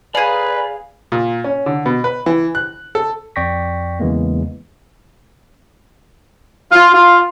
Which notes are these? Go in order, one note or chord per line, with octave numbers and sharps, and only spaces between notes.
G#4 B4 D5 F5 G#5
A#2
C#4
D3
B2
B4
E3
F#6
A4
F2 D5 G5 C#6 A#6 B6
E2 C#3 E3 G#3 A#3 B3
F4
F4